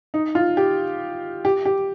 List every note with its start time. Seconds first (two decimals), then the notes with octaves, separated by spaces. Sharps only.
0.14 D#4
0.35 F4
0.57 G4
1.45 G4
1.65 G4